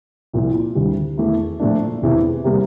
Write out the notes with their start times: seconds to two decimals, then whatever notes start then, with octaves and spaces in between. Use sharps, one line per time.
0.33 C2 A#2 F3 A#3
0.75 D2 C3 G3
1.18 E2 E3 A3 E4
1.60 A#2 F3 A3 D4
2.02 E1 E2 C3 E3
2.44 C3 G3 A#3